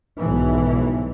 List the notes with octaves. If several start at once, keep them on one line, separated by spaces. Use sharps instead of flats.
B1 G#2 E3